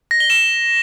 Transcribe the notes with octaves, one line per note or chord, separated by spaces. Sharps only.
A#6
G7
E7